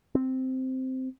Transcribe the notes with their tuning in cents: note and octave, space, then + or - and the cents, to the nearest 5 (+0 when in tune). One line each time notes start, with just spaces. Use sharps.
C4 -5